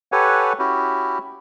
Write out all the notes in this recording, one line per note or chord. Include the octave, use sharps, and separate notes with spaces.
G4 A4 B4 C#5 F#5 G#5
C#4 E4 F#4 G4